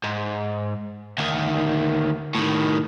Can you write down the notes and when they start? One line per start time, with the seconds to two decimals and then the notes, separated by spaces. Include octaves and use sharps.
0.04 G#2
1.18 D2 D#3
2.35 A2 D#3